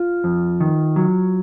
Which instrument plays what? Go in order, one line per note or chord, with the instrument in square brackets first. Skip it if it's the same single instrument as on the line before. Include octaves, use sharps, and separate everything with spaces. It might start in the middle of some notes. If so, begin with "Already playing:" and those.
Already playing: [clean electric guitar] F4
F2
D#3
F#3